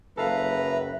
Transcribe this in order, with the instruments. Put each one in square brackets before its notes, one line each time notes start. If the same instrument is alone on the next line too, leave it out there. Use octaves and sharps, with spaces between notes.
[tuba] F#1 [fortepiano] A4 F5 [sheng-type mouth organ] B4 A#5 [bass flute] E5